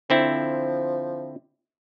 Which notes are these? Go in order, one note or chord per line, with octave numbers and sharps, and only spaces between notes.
D3 F3 C4 E4